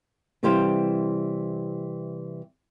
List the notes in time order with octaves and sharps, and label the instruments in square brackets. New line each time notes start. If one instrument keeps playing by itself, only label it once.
[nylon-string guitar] C3 E3 G3 G4 C5 F5